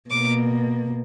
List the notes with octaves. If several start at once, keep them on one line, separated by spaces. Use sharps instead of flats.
B2 A#3 D6